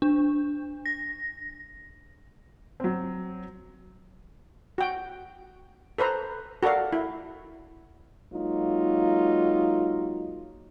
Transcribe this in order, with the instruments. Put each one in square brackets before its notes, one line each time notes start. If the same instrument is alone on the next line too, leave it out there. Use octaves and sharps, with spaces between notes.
[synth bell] D4
A#6
[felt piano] F#3 C4
[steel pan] F#4 G5
A4 B4 C5 A#5
F#4 A4 A#4 D5 F5
E4
[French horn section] F#3 G#3 A#3 D#4 F4